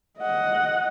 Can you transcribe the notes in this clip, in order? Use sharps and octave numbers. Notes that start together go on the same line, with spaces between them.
D#5 F#5